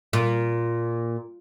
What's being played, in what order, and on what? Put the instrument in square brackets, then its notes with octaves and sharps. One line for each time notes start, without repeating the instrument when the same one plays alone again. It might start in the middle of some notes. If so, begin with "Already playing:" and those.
[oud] A#2